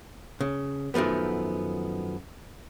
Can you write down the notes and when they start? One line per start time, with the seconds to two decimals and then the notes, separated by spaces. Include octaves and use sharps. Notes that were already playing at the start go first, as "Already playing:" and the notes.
0.40 C#3
0.94 F#2 D#3 F3 A3 B3